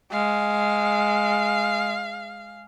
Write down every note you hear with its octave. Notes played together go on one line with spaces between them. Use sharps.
G#3 F5